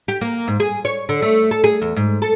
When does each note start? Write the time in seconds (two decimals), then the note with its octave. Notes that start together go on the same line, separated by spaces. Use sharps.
0.08 G4
0.21 A#3
0.48 G#2
0.60 G#4
0.85 C#5
1.09 D3
1.22 A3
1.51 A4
1.64 G#4
1.82 E2
1.96 G#2
2.22 A4